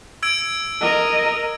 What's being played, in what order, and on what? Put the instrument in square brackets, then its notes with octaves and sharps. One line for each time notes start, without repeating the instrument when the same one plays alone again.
[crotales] E6 G#6 D7
[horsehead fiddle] A#4 D#5